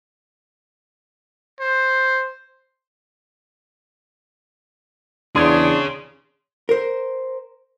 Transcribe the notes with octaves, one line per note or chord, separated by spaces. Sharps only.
C5
E2 D4 G#4 C#5 C6 D#6 G#6
A#4 C5